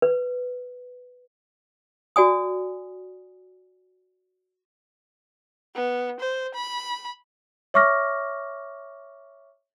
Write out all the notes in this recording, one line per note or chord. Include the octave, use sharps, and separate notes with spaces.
B4
F#4 D5 G#5 D#6
B3
C5
B5
C#5 E5 C#6 D6 F6 A#6